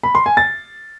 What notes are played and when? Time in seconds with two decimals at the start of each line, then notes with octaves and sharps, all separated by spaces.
0.03 B5
0.15 C6
0.26 G#5
0.37 A6